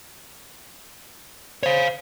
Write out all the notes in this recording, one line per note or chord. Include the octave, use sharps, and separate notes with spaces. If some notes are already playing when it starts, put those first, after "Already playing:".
C5 C#5 F5